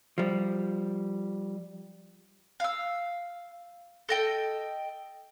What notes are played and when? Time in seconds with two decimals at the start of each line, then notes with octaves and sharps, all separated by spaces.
0.18 F3 G3
2.60 F5 E6
4.09 A4 D#5 G5